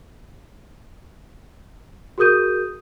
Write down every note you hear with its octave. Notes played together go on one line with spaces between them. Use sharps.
F#4 G#4 A#4 D#6 G6 D#7